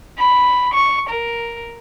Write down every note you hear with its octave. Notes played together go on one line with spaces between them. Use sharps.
B5
C#6
A#4